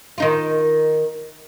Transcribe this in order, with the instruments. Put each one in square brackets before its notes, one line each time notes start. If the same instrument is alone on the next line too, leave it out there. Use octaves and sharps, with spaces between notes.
[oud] D#3 D#4 F4